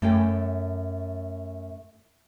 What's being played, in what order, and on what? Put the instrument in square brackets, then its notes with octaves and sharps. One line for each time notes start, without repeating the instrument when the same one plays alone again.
[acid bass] F#2 [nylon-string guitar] A3 C#5 G5